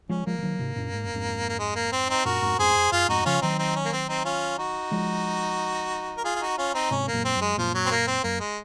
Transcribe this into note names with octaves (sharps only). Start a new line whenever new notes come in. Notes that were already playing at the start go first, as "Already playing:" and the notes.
F3 G#3 C#4
F3 G#3 A#3
F3
D#3 F#3
G#2 C3
F#2 A#2
G#2
F#2
F2 G#2
A#3
G#3
A#3
C4
C4 D#4
F#2 A#2 F#4 A#4
F2 G#2
F2 G#2 G#4 C5
F2
F#2 F4 G#4
F2 G#2 D#4 F#4
C#3 F3 C#4 F4
D#3 F#3 C4 D#4
C4 D#4
C#4
A#3
C4
C4 D#4
C#4 F4
D#4 F#4
F3 G#3
A#4
F4 G#4
F4
D#4 F#4
C#4 F4
C4 D#4
G#2 C3 C#4
A#3
F#2 A#2
C4
F#2
G#3
F#2 A#2 F3
F#3
C4
A#3
C4
F#2 A#3
G#3